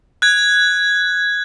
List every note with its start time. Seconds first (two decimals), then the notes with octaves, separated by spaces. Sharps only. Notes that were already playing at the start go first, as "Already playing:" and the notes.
0.22 F#6 G#6